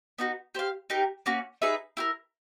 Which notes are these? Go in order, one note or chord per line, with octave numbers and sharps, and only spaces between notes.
B3 D#4 F#4
G4 C5 F5
D#4 G4 A#4
A#3 C#4 F#4
D#4 G#4 B4 E5
E4 G4 A#4